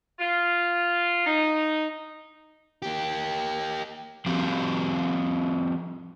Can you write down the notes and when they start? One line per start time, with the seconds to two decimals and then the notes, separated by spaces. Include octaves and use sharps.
0.19 F4
1.26 D#4
2.82 A#3 G4
4.26 F3 G3 C4 F#4 G4